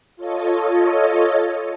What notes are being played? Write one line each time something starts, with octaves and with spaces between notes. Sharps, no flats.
F4 A4 C#5 D#5